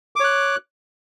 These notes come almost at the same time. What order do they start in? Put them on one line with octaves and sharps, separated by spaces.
D6 C#5 F#6